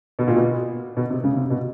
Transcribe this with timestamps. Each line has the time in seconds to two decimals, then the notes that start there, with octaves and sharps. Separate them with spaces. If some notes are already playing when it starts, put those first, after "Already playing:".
0.19 B2
0.28 A#2
0.36 B2
0.97 B2
1.10 C3
1.24 C#3
1.36 C3
1.50 B2